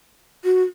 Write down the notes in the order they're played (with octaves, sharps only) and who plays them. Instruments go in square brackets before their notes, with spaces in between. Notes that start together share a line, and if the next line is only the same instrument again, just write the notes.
[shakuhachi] F#4